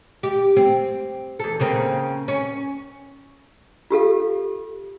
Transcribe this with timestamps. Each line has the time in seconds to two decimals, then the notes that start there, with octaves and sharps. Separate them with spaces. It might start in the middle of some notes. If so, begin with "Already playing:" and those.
0.23 G4
0.56 C4
1.39 E2 A4
1.60 C#3 A#3 C4
2.28 C#4
3.91 F4 G4 A4 F5